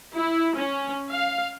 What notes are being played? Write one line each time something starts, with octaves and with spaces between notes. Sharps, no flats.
E4
C#4
F5